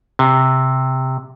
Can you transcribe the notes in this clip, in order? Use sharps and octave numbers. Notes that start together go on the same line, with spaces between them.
C3